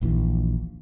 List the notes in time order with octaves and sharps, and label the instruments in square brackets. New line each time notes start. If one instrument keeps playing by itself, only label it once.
[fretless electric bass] D#1 A#1 D#2 E3